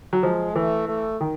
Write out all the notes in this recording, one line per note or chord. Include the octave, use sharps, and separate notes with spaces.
F#3
F3 G#3
E3 A3
A3
D#3